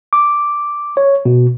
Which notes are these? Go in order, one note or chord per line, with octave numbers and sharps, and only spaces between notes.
D6
C#5
B2